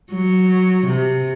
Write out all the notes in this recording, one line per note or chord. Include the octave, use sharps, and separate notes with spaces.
F#3
C3